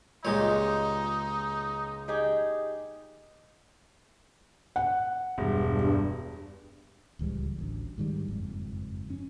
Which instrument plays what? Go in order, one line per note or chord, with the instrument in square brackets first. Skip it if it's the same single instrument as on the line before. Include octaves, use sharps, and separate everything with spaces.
[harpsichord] C#2 G#3 C#5 [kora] A#2 G4 D#5 [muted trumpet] D#4
[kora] D#4 G4 G#4
[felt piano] F#5
[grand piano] E1 [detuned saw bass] G2
[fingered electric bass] D1 C#2 E3 G3
A1 D2
G#2 D#3 G3
F#1 F2 G#2
C#4